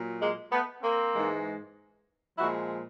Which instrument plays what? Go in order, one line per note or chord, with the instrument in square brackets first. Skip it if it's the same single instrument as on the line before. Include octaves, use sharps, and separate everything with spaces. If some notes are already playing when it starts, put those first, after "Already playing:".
Already playing: [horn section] A#2 F#3
G#3 A#3
A3 B3
A#3 C4
G#2 E3 G#3
A#2 F3 G#3 E4 F#4